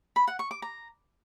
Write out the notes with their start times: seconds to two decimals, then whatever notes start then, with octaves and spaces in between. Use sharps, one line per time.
0.16 B5
0.28 F#5
0.39 C#6
0.51 D6
0.62 A#5